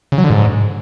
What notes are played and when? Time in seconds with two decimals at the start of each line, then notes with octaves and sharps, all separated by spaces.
0.12 C#3
0.18 F#3
0.24 D3
0.30 G#2